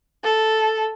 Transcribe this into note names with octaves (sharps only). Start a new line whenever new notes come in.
A4